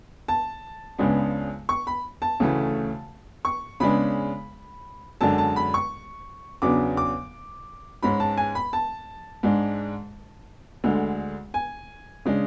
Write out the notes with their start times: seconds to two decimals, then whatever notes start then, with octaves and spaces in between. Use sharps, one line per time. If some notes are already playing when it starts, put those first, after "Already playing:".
0.28 A5
0.98 C#2 C#3 G#3 B3 D4
1.69 C#6
1.87 B5
2.22 A5
2.40 D2 C#3 E3 A3
3.45 C#6
3.80 C#3 G#3 B3 D4 B5
5.21 F#2 D3 G#3 D4 A5
5.38 A5
5.56 B5
5.74 C#6
6.62 E2 C#3 F#3 B3 D4 D6
6.97 D6
8.03 G#2 G#3 C#4 B5
8.20 A5
8.37 G#5
8.55 B5
8.73 A5
9.43 G#2 G#3 D4
10.84 D2 D3 G#3
11.54 G#5
12.25 C#3 G#3 D4